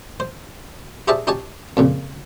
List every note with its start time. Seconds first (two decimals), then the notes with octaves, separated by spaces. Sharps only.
0.20 C5
1.08 G4 G#4 C5 D5 E5 A5
1.27 D#4 G4 C#5 G#5 A5
1.77 F2 A#2 C#3